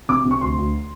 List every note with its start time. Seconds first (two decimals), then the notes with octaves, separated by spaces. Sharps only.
0.09 C3 D6
0.25 C3
0.31 C#6
0.41 D2 C6
0.58 D2